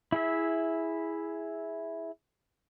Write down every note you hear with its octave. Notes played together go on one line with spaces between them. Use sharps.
E4 G#4 E5